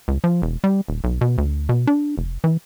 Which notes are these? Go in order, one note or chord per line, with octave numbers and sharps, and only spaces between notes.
C#2
F3
E1
G3
D#1
B1
B2
D2
B2
D4
F1
E3